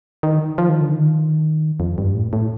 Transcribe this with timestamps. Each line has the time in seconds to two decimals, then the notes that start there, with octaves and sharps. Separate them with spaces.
0.23 D#3
0.58 F3
0.69 D#3
0.81 D3
0.93 D#3
1.80 F2
1.98 G2
2.15 A2
2.33 A2